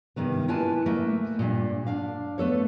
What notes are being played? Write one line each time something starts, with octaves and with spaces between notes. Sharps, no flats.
G2 C3 D#3 B3
A#3 E4 F4 B4 G#5 A5
A3 A#3 B4 E5
G2 A#2
D4 F5
A3 B3 A4 C#5